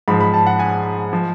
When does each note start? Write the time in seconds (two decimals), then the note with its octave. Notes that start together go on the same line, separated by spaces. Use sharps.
0.08 G#2 F3 B5
0.21 B5
0.33 A5
0.46 F#5
0.59 G#5
1.13 F3